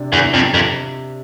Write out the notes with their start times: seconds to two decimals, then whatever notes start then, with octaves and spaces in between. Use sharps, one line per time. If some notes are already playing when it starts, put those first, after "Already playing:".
Already playing: C3 D4
0.13 E2
0.34 F2
0.54 F2